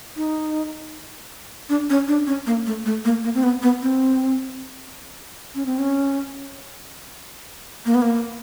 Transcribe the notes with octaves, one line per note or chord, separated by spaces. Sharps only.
D#4
D4
C#4
D4
C#4
A#3
A3
A3
A#3
A#3
C4
B3
B3
C4
C#4
C4
C#4
A#3
B3
A#3